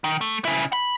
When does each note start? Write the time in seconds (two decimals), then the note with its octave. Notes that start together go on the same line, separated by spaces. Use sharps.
0.04 D#3
0.21 A3
0.45 C#3 E4
0.73 B5